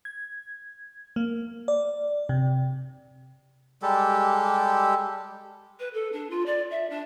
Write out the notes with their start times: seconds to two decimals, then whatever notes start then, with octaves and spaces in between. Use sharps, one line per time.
0.05 G#6
1.16 A#3
1.68 D5
2.29 C3
3.82 G3 G#3 G4 A4
5.79 B4
5.93 A4
6.12 D4
6.30 F4
6.46 D5
6.70 E5
6.90 D4